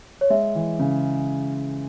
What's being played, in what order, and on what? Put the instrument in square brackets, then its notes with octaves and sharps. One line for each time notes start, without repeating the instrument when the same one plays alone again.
[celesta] C#5
[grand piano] G#3 [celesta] E5
[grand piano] E3
C#3